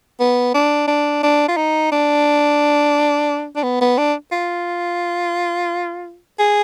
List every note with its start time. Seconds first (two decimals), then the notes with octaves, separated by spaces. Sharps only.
0.20 B3
0.54 D4
0.88 D4
1.23 D4
1.48 F4
1.57 D#4
1.92 D4
3.56 D4
3.63 B3
3.81 B3
3.98 D4
4.32 F4
6.39 G#4